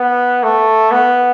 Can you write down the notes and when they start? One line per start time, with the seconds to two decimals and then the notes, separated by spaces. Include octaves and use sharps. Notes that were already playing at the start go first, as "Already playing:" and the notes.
Already playing: B3
0.43 A3
0.91 B3